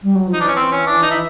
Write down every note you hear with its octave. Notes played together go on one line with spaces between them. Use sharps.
G3
F#3
F3
D#4
E3 D4
C#4
C4
C#4
D4
D#4
E4